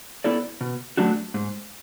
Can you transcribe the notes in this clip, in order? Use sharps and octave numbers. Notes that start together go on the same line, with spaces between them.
B3 E4 A4 D5
B2
F#3 A3 D4 F#4
G#2